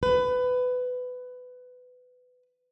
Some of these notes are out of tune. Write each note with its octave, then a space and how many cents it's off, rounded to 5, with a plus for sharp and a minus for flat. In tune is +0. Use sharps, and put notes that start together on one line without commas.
B4 +20